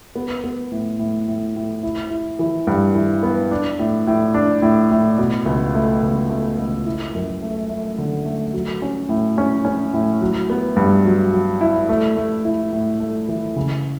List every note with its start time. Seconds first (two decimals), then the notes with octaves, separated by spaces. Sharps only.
0.15 B3
0.44 B3
0.71 A2
0.99 A2
1.28 A2
1.56 A2
1.83 E4
2.11 E4
2.39 E3
2.67 G2
2.95 E3
3.23 B3
3.51 D4
3.79 A2
4.07 A2
4.34 D4
4.62 A2
4.91 A2
5.18 B2
5.46 C#2
5.75 A3
6.03 C#2
6.30 A3
6.59 C#2
6.86 E4
7.15 F#2
7.42 A3
7.69 A3
7.98 D3
8.25 A3
8.53 F#3
8.82 C#4
9.09 A2
9.38 C#4
9.65 C#4
9.93 A2
10.21 F#3
10.50 B3
10.76 G2
11.05 F#3
11.33 F#3
11.61 E4
11.89 A3
12.16 A3
12.45 E4
12.73 A2
13.00 A3
13.28 E3
13.56 C#3